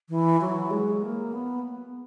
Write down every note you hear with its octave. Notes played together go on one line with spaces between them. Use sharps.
E3
F#3
G#3
A#3
B3